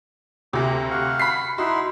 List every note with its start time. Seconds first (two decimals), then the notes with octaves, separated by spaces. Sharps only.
0.53 D2 C3 E5 D6
0.91 F5 F#5 C#6
1.19 B5 B6 C7
1.58 D#4 E4 F#4 C6